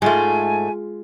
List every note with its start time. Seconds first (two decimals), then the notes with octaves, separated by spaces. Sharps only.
0.02 G#2 G#3 A3 F4 G#5